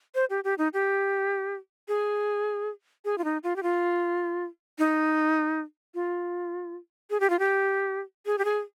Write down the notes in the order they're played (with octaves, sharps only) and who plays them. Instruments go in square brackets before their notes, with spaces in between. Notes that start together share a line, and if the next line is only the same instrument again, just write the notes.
[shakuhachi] C5
G4
G4
D#4
G4
G#4
G#4
F4
D#4
F4
G4
F4
D#4
F4
G#4
G4
F4
G4
G#4
G4
G#4